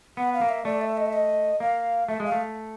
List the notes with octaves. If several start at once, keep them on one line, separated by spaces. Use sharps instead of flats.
B3 F#5
F5
A#3
E5
A3 D5
E5
D#5
E5
D#5
A#3 F5
A3 E5
G#3
F5
A3